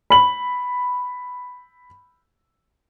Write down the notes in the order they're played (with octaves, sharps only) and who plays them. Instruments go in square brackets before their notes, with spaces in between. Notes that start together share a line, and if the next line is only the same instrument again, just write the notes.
[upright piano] B5 F#7